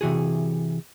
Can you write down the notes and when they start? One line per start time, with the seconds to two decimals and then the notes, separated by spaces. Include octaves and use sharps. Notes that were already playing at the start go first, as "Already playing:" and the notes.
0.01 C3 E3 F#4 G#4